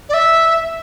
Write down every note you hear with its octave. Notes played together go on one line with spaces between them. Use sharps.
D5
E5